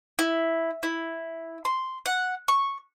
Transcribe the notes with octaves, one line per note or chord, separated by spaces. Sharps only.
E4
E4
C6
F#5
C#6